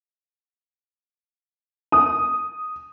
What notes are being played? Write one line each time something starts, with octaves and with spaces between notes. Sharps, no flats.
D#6